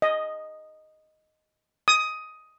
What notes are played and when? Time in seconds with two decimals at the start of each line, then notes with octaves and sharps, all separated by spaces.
0.02 D#5
1.88 D#6